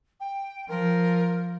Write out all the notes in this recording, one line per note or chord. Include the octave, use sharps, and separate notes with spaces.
G5
F3 A#4